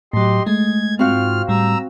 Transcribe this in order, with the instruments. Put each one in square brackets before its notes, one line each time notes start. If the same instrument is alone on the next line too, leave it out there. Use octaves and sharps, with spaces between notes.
[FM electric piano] A2 F#3 [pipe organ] G4 D#5 C6
[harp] G#3 [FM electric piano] A3 [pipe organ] G#6
[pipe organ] G#2 F4 F6 [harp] C4 F#4 F5
[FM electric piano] A2 G3 [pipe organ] A#5 E6